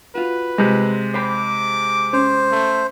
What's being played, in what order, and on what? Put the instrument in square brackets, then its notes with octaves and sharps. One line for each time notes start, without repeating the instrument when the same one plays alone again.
[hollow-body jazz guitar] F4 F#4 [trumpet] B4
[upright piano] C3 G#3
[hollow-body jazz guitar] C5 G5 B5 [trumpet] D6
[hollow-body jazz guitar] C#4 [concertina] C5
[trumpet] A3